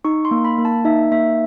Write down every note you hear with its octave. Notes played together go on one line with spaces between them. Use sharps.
D#4 C#6
C6
A#3
B5
A#3
A5
D#4 E5
A#3 E5